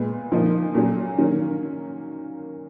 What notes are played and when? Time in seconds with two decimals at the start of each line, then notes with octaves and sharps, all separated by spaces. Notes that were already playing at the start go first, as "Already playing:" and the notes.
Already playing: A#2 G#3 B3
0.32 A#2 F3 A#3 D#4
0.75 A#2 F#3 C#4
1.18 D#3 F#3 A#3 C#4